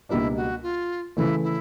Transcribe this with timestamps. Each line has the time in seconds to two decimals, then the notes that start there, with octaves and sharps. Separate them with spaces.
0.09 C#2 B2 G3 A#3 D4 E4
0.36 F#4
0.63 F4
1.17 C#3 E3 A3 E4
1.43 E4